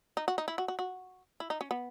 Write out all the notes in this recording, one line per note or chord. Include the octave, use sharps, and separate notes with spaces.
D#4
F#4
D#4
E4
F#4
F#4
F#4
E4
D#4
C#4
B3